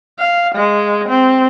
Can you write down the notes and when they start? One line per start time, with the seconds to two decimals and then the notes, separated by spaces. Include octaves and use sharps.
0.19 F5
0.55 G#3
1.09 C4